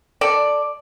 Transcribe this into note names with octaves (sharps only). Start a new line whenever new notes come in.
A4 D5